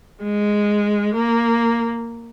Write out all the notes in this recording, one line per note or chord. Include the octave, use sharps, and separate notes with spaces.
G#3
A#3